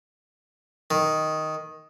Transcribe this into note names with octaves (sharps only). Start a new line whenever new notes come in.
D#3